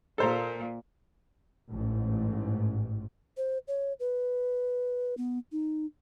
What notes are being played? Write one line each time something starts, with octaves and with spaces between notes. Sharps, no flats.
A#2 A4 C5 A#5
A1 G#2
C5
C#5
B4
B3
D#4